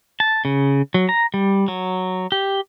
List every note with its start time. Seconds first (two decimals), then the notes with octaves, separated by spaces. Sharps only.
0.20 A5
0.45 C#3
0.94 F#3
1.09 A#5
1.34 G3
1.68 F#3
2.32 G4